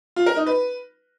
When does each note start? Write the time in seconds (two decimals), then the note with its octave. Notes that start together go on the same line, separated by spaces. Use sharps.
0.16 F4
0.26 A#4
0.36 D#4
0.46 B4